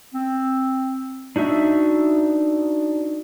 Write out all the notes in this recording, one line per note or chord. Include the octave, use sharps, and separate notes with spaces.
C4
D4 D#4 F#4 E5